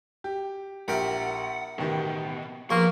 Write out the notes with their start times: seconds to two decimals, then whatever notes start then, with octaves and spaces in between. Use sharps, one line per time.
0.24 G4
0.88 A#1 E4 G4 A#4 F#5 B5 D7
1.78 A1 B2 D#3 G4
2.70 A#1 A#3 B3 C6 C#6